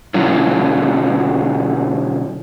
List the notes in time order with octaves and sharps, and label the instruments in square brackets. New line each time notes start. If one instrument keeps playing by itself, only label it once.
[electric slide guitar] B2 D3 F#3 C#4 E4 F4